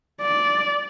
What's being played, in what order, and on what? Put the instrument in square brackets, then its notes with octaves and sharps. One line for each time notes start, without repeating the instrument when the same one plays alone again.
[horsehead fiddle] D5